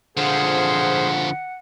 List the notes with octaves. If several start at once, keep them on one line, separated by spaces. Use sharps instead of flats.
D3 F3 F4 G#4 C5 F#5